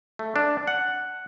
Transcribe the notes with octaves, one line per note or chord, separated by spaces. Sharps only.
A3
D4
F#5